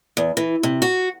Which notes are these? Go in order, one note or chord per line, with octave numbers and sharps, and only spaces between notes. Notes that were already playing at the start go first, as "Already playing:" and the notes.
E2
E3
C3
F#4